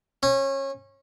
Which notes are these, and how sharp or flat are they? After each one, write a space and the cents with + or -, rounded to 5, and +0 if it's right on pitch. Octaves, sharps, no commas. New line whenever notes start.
C#4 -25